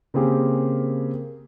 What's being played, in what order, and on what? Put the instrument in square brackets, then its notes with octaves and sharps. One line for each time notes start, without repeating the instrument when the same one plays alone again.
[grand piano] C#3 A#3 C4 G4 G#4 A#4